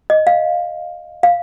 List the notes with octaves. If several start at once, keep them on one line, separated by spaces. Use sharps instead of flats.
D#5
F5
F5